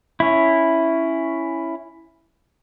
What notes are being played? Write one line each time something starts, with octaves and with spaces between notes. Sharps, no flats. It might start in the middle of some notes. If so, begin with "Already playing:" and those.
C#4 E4